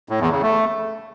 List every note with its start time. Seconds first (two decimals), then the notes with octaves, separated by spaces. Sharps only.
0.09 A2
0.20 E2
0.31 C#3
0.43 A3